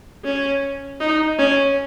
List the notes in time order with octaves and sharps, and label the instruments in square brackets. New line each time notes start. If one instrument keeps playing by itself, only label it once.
[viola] C#4
D#4
C#4